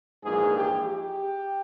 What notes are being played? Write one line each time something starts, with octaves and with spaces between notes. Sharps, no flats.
A#1 G#2 E3 A#3 G#4
G4
G4